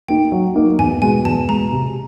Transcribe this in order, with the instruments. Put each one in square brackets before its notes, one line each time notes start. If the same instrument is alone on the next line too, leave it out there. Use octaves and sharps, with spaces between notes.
[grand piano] A#3 D#4 [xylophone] G5
[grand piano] F#3
A#3 D#4
[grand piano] E2 [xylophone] G#5
[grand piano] B2 G#3 [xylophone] G#5
[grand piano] E2 [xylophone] A5
[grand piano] B2 G#3 [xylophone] A#5
[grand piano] C3